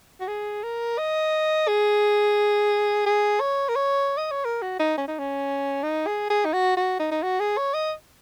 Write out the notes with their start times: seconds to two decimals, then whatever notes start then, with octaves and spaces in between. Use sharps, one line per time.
0.21 F#4
0.28 G#4
0.63 A#4
0.98 D#5
1.68 G#4
3.06 G#4
3.40 C#5
3.69 A#4
3.76 C#5
4.18 D#5
4.31 C#5
4.45 A#4
4.62 F#4
4.80 D#4
4.98 C#4
5.08 D#4
5.19 C#4
5.83 D#4
6.07 G#4
6.30 G#4
6.45 D#4
6.53 F#4
6.77 F#4
6.99 D#4
7.11 D#4
7.23 F#4
7.40 G#4
7.57 C#5
7.74 D#5